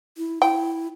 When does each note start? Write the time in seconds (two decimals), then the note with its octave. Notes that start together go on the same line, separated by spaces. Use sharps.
0.18 E4
0.42 E4 G5